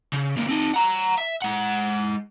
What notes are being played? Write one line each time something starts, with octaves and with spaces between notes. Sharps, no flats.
C#3
C#2 A#3
C4 D#4
F#5 A#5
E5
G#3 F#5